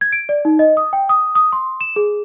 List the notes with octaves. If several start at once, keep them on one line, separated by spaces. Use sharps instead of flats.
G#6
D7
D5
D#4
D#5
D#6
G5
D#6
D#6
C6
E7
G#4